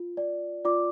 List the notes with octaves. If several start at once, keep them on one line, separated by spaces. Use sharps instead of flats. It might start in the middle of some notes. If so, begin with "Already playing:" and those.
Already playing: F4
D5
F4 D5 D6